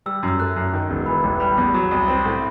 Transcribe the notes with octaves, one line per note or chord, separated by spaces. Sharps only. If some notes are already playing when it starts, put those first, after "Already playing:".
G3 E6
F#2
E6
A3 F#6
F#2
D#3
E1
E3 B5
A1
G3 B5
E2
F#3
C2
C4 B5
A2